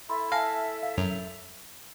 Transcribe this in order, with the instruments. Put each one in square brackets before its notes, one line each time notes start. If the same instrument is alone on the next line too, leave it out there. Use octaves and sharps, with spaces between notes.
[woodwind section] E4 A4 E5 [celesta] B5 C6
[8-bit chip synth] F5 [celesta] G#5 A5 A#6
[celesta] F5
[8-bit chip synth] F#2 [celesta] F7